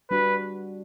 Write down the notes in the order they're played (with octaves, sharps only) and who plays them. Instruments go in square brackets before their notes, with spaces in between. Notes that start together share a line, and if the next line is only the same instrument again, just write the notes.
[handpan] G3 D4 F#4 [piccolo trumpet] B4